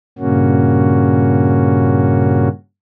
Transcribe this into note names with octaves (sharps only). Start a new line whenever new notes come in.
G2 A#2 C#3 A#3 C#4 F#4